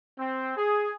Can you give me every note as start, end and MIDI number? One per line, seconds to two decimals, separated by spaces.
0.19 0.53 60
0.56 0.92 68